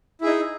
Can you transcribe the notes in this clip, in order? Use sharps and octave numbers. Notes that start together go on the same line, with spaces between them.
D#4 E4 G#4